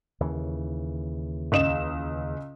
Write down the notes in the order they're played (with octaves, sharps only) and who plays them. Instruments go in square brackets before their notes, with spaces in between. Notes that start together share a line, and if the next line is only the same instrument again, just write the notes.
[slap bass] D#2 C#3 E3
[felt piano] C#2 D#5 E7